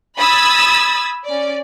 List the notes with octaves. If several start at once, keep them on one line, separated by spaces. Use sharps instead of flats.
B5 D#6 E6 G#6 A6
C#4 D5